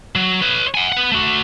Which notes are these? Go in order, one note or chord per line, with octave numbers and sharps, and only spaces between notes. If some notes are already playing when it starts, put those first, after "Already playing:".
F#3
B4 C#5
F#5 G#5
B4 F#5
A3 F#4